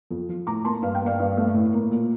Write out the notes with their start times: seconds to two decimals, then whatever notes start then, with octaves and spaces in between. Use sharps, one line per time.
0.11 F2
0.29 F3
0.47 A2 A#5 D6
0.65 A#3 A5 C6
0.82 G2 F5
0.95 G5
1.01 A#3
1.06 D5 F5
1.19 G2
1.37 A3
1.54 A2
1.73 A#3
1.91 A#2